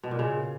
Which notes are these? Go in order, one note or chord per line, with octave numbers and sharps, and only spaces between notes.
B2
A#2
C#3